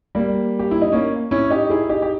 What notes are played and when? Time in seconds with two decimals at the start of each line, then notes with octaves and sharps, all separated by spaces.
0.15 G3 A#3
0.59 G4
0.71 E4
0.82 D#4
0.92 A#3 C#4
1.31 C#4 E4
1.50 D#4 G4
1.70 E4 G#4
1.89 D#4 G4
2.02 G4